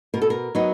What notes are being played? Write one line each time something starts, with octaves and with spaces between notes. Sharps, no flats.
B2 A#4
A4
A#4
F#3 B3 D#4